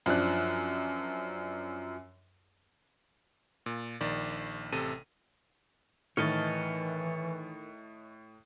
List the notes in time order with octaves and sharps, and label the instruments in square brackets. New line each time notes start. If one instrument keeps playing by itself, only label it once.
[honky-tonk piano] F#2 F3 D4 F#6
[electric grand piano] A#2
A#1 D#3 D5
A1 C3 A4 D#7
[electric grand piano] A2 F6 [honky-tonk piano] D#3 [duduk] E3 [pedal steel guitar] C#5 D#5 A5